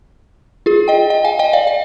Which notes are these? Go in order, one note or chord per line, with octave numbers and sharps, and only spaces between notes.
F4 G#4
D#5 G5
D#5 G5
F5 G#5
D#5 G5
D5 F5
F5